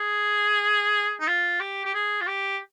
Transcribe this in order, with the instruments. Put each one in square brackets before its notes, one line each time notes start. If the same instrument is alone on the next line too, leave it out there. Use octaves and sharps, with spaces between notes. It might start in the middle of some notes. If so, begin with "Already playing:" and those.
Already playing: [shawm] G#4
D#4
F4
G4
G4
G#4
F4
G4